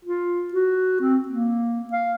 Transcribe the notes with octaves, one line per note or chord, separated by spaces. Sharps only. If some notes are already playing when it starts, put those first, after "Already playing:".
F4
F#4
C4
A#3
F5